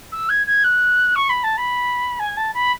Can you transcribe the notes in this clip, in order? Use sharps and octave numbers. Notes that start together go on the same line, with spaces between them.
E6
G#6
G#6
F#6
C#6
B5
A5
B5
G#5
A5
B5